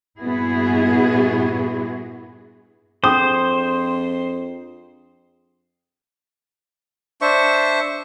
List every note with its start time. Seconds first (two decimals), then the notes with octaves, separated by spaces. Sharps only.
0.19 G2 A#2 B3 E4 F#4 G#4
3.04 F2 D4 G#4 C5 G5 D#6
7.21 D4 C5 E5 C#6